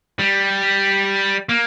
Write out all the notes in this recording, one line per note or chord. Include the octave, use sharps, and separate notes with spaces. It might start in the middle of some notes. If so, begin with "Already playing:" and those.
G3
A#3